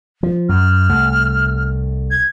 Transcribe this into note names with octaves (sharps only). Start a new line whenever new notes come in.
F3
F#2 F6
C2 A3
G#6